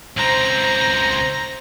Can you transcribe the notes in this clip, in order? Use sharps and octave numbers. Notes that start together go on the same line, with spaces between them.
C#2 C4 C5 A#5